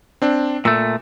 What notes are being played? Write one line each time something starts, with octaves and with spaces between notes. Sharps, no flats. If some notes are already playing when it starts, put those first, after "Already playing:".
C4 D4
A#2 A3 E6